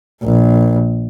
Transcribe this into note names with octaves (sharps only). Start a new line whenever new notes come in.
A#1